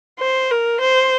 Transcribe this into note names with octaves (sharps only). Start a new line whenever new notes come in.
C5
A#4
C5